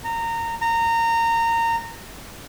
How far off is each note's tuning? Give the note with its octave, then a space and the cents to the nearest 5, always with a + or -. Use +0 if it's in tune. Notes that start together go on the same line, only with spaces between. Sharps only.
A#5 -20
A#5 -20